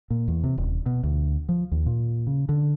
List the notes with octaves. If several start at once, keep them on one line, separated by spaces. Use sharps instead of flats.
A#2
E2
C3
D#1
B2
D2
F3
D#2
A#2
C#3
D3